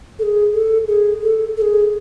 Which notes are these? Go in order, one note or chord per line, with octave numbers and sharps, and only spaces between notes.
A4
G#4
A4
G#4
A4
A4
G#4